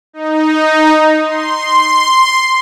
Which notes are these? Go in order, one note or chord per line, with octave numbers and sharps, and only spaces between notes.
D#4
C6